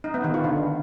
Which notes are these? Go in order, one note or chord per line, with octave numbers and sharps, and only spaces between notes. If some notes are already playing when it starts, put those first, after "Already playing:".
D#4
B3
D#3
F4
D3